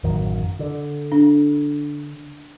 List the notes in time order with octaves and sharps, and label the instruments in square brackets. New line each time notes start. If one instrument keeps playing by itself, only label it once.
[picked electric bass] A1 F#2 D#3
D3
[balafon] D4